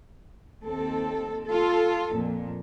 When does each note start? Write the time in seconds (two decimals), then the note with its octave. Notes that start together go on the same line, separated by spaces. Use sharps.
0.64 D#2 C4 A4
1.47 F4 A4
2.12 F2 A#2